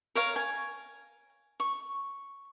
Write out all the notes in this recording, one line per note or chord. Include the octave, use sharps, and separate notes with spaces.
A#4 C#5 F5
G#5
C#6